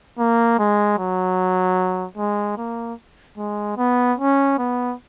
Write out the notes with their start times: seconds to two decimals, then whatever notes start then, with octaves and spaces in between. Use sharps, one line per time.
0.19 A#3
0.59 G#3
0.98 F#3
2.17 G#3
2.57 A#3
3.37 G#3
3.77 B3
4.18 C#4
4.58 B3